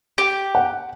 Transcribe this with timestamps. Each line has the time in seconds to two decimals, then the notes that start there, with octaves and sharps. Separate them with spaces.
0.18 G4
0.55 F#5